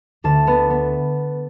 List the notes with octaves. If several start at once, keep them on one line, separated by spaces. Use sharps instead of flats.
D2 A5
B3
B3